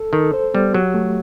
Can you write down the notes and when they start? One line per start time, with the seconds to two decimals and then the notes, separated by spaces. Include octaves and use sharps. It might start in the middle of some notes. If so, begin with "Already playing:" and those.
Already playing: A4
0.13 D#3 A4
0.33 C5
0.54 G3 B3
0.74 F#3 G4
0.94 A3